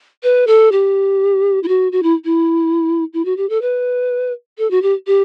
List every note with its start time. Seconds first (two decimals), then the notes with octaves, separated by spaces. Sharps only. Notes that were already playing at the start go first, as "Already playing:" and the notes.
0.23 B4
0.47 A4
0.72 G4
1.63 E4
1.68 F#4
1.92 F#4
2.03 E4
2.25 E4
3.13 E4
3.25 F#4
3.37 G4
3.49 A4
3.62 B4
4.58 A4
4.71 F#4
4.82 G4
5.07 G4